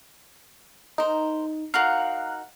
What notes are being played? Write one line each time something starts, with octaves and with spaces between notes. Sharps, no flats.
D#4 A#4 C5
D#4 F#4 A#4 F5 F#6